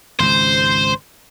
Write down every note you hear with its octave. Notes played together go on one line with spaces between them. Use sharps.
G#1 C#2 C5